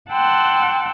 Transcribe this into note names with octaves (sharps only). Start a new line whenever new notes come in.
F#5 G5 A5 C6 E6 F#6